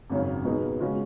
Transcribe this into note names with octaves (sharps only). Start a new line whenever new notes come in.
G#1 F#2 C#3 F#3
B2 F#3 B3 D#4 G#4
C#3 G#3 C#4 F#4